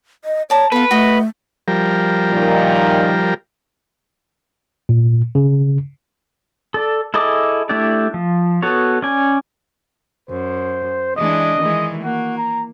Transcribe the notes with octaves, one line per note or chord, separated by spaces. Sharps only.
D#5
C#5 D5 A5 A#5
B3 F4 A4 B4
A3 F#4 D#5
F3 G3 A#4
A#2 D#3
A#2
C#3
A4 D5
E4 G#4 A4 D#5 D6
A3 D4 E4 G4 D5
F3
B3 F#4 A4 C#5
C#4 D5 G#5
F#2 C5
E3 G#3 D4 D#5
D#3 E3 G#3
A#3 F#4
A#5